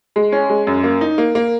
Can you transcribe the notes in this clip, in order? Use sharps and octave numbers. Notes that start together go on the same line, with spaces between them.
G#3
C#4
G#3
F#2
A#3
D#4
A#3
A#3